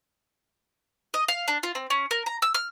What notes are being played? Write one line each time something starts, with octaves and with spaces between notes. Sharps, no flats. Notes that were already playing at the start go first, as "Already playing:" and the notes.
D#5
F5
D4
F4
C4
C#4
A#4
A#5
E6
F6